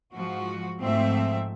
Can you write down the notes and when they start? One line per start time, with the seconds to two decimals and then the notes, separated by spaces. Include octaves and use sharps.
0.14 G#2 F3 F#4
0.80 G#2 F3 A3 C4 E5